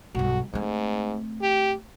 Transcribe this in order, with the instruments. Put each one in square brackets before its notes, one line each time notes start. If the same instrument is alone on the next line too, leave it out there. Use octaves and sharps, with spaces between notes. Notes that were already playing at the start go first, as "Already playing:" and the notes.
[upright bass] B1 G2 [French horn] F#4
[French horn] G#2 [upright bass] A3 C4
[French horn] G4